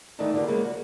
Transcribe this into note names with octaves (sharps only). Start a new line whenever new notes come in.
D#3 E3 A3 B3 D4
D3 A#3 F4 G4 B4
C#3 F3 G#3 A#3 B3
F#4